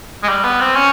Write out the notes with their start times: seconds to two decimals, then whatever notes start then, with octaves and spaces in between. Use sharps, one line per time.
0.23 G#3
0.29 G3
0.45 B3
0.61 C4
0.76 C#4